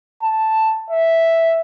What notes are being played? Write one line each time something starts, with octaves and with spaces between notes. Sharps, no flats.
A5
E5